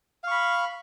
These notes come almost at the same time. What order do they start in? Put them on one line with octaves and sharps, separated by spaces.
F5 C#6 B5